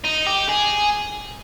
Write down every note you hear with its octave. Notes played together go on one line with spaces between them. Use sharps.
D#4
G4
G#4